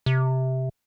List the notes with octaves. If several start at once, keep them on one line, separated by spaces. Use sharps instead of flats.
C3